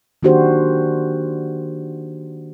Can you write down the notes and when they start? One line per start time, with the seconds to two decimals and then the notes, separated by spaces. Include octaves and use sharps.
0.23 D#3 A#3 D4 F#4 G4 C5